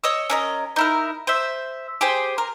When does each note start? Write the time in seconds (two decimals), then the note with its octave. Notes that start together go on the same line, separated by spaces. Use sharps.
0.04 C#5 D#5 E6
0.30 C#4 A#4 D#5
0.76 D#4 E4 A#4
1.27 C5 E5
2.01 G4 G#4 C5
2.38 A#4